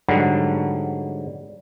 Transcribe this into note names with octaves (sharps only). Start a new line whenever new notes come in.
G#2 D3 F#3 G3